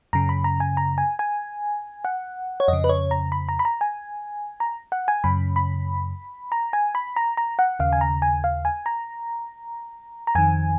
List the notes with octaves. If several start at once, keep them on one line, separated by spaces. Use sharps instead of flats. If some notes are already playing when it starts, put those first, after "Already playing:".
F#2 C#3 A#5
B5
A#5
G#5
A#5
G#5
G#5
F#5
C#5
F2 C#3 D#5
B4
C#5
A#5
B5
A#5
B5
A#5
G#5
A#5
F#5
G#5
F#2 C#3 B5
B5
A#5
G#5
B5
A#5
A#5
F#5
D#2 C#3 F5
G#5
A#5
G#5
F5
G#5
A#5
A#5
F2 D#3 G#5